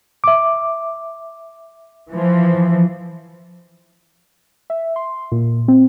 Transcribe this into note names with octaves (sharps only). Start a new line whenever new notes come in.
E5 D6
E3 F3
E5
C6
A#2
C4